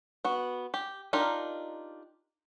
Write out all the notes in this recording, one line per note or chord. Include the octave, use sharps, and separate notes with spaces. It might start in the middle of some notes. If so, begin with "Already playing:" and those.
B3 F#4
G4
D4 D#4 F4 G4 A#4